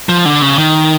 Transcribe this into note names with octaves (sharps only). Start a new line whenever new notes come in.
F3
D3
C#3
D#3